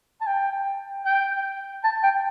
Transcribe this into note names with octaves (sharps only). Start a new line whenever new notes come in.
A5
G5
G5
A5
G5